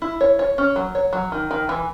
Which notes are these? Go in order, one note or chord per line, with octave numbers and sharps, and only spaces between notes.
E4
C#5
C#5
C#4
F#3
C#5
F#3
D#3
D#3
E3